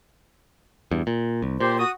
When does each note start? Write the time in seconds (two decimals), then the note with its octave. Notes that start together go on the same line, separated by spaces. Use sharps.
0.91 E2 G2
1.07 A#2
1.42 C2
1.60 A#2 G4 C5
1.79 F#4 D#6